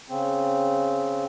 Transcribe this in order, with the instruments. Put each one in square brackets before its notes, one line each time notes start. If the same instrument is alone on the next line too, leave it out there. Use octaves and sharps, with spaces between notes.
[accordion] C#3 C4